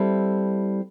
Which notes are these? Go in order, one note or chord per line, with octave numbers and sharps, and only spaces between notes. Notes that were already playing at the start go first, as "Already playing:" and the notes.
Already playing: G3 C4 E4 A4